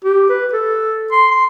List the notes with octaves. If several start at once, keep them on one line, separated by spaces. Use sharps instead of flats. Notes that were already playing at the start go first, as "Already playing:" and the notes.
G4
B4
A4
C6
C6